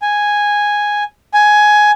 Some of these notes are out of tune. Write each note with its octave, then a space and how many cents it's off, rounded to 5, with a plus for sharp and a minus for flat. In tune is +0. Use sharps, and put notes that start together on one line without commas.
G#5 -5
G#5 +10